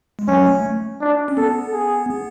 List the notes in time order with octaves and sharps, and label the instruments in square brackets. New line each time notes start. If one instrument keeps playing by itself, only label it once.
[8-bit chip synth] G#3
[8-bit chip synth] F#3 [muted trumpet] C#4
[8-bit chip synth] A3
[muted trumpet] D4
[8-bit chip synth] C#4
[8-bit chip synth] B3 [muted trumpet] A4
[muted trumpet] G#4
[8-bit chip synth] B3